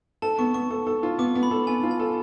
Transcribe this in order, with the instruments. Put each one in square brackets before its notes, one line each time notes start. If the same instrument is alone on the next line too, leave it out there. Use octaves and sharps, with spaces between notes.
[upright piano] A4 [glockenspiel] A5
[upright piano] B3 [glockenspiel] C#6
[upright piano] B3 [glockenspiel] C#6
[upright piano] A4
A4
F4
[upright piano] B3 [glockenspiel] D6
[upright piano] B3
[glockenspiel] B5
[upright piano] A4
[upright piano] B3 [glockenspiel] G#5
[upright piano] F4
[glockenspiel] G#5
[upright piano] A4